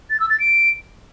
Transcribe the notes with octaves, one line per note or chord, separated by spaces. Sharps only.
A6
E6
A6
D7